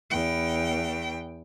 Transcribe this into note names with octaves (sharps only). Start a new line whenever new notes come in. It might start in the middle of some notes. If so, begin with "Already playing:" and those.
E2 G5